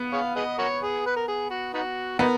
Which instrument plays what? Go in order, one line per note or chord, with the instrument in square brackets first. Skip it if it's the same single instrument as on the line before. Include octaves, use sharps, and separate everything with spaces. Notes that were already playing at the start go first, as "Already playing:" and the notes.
Already playing: [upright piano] B3
[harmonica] G#4 C#5 F5
G#4 B4 D#5
F#4 A#4 C#5
G#4
B4
A#4
G#4
F#4
B3 D#4 F#4
[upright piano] B3 [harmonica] D#4 F#4 A#4